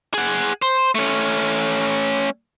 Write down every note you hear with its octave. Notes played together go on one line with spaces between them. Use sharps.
G#4 F#5
C5
A3 C#4